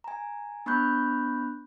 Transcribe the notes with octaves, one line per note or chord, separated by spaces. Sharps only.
G#5 A#5
B3 D4 B5 C#6 F#6 G6